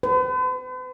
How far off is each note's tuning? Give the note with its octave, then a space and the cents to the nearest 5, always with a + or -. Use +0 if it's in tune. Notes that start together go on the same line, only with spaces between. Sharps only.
B4 +45